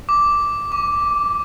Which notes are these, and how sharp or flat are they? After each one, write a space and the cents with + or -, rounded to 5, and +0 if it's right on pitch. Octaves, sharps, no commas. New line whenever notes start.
D6 -5
D6 -35